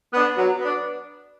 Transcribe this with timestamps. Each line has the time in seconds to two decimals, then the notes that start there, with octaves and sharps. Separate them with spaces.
0.13 B3 D4
0.37 F#3
0.59 B3 D4